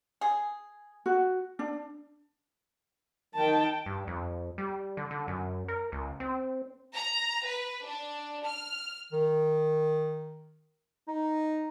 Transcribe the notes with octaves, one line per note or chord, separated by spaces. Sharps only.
G#4
F#4
D4
D#3 G5 A5
G2
F2
G3
D3
D3
F#2
A#4
C#2
C4
A#5
B4
D4
F6
D#3
D#4